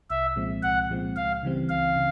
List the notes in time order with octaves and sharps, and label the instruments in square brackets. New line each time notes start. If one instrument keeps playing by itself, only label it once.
[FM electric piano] C2 [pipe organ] E5
[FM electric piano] A#2 F3 G#3 C4
[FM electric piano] C2 [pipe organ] F#5
[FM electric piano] A#2 F3 G#3 C4
[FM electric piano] C#2 [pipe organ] F5
[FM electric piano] C#3 E3 G3 C4
[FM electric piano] C#2 [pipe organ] F5
[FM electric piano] C#3